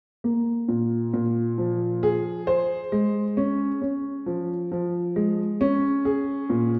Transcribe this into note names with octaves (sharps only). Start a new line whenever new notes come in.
A#3
A#2
A#2
F3
G#4
C5
G#3
C#4
C#4
F3
F3
G#3
C#4
G#4
A#2